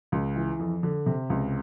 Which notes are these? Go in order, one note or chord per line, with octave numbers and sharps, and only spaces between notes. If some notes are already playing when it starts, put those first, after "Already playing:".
C#2
E3
F2
D3
C3
C#2